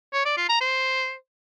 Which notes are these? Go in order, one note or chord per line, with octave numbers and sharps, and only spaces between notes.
C#5
D5
F4
A#5
C5